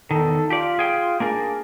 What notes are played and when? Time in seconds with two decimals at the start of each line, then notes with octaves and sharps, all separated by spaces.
0.11 E2 D#3 A4
0.50 F4 G4 D5
0.79 G#4 G5
1.20 A#3 D4 G#4 A#4